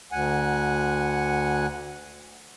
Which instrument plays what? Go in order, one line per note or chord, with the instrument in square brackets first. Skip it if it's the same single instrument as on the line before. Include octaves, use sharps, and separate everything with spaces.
[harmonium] D2 F#5 G#5